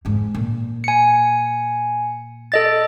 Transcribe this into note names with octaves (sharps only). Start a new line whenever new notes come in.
F2 G#2
A#2
G#5 C#7
A4 D#5 A6